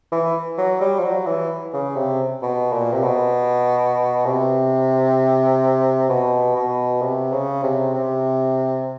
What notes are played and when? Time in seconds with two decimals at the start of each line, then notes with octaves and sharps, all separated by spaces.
0.12 E3
0.58 F#3
0.81 G3
0.99 F3
1.05 F#3
1.27 E3
1.73 C#3
1.96 C3
2.42 B2
2.73 A#2
2.93 C3
3.03 B2
4.26 C3
6.09 B2
6.56 B2
7.02 C3
7.32 C#3
7.63 C3
7.94 C3